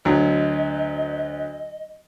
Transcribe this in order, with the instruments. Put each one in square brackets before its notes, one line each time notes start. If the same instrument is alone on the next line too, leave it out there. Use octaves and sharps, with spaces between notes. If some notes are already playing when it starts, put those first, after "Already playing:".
[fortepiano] D2 F#3 [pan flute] D#5